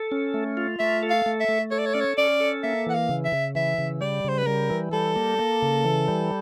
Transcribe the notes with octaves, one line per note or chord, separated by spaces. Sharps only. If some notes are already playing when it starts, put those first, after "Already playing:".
Already playing: A4
C#4
A3
F4
A3 E5
A4
F5
A3
E5
A3
A4 C#5
D5
C#5
C#4 D5
C#5
C#4 D5
A4
A#3 E5
E3 F#5
F5
C#3
E5
C#3
E3 E5
C#3
G3 D5
C#3 C5
B4
G3 A#4
E3
G3 A4
A#3
A#3
C#3
E3
G3